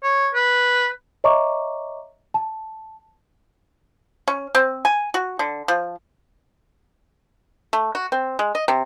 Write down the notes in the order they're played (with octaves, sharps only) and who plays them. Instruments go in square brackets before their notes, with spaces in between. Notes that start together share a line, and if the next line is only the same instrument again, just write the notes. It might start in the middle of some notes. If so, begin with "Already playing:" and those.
[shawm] C#5
B4
[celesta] C#5 D#5 E5 A#5 C#6 D6
A5
[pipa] C#4
C4
G#5
F#4
D3
F3
A3
F#4
C4
G#3
D#5
C3